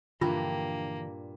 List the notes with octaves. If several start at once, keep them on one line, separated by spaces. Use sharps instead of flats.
G2 A#2 D3 E3 F3 A#3 F4 G4